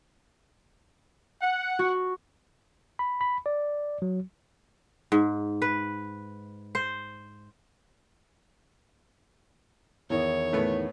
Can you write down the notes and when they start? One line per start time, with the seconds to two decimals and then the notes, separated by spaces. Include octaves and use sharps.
1.42 F#5
1.79 F#4
2.99 B5
3.21 B5
3.46 D5
4.02 F#3
5.12 G#2
5.62 B4
6.75 C5
10.10 E2 D#3 C#5
10.53 A2 A3 B3